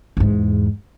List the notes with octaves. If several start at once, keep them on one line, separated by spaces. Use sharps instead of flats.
E2 G#2